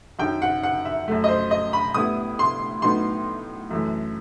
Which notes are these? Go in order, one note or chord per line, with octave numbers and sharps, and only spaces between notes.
F#2 D#3 F#3 G5
F#5
F#5
E5
F#2 F#3 A3
D#5
C5
D#5
B5
A2 G3 B3 E4 D#6
C6
A2 F#3 B3 D#4 C6
F#2 E3 A3